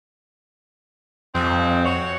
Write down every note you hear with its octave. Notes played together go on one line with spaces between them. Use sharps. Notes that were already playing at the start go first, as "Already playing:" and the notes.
F2 G3 G#3 C4
F#4 C#5